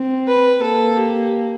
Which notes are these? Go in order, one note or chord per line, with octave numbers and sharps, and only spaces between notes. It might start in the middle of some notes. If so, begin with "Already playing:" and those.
Already playing: C4
B4
A#3 A4
G4